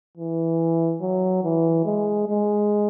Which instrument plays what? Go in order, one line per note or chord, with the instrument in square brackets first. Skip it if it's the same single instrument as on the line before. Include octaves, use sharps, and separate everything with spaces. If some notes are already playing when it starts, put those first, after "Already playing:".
[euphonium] E3
F#3
E3
G#3
G#3